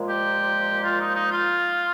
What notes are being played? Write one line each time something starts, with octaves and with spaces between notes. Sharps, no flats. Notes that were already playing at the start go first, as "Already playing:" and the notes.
Already playing: A#2 F3 G#3
G4
F4
D#4
D#4
F4